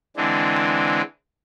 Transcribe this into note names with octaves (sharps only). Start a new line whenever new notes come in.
D3 E3 G#3 C4 D4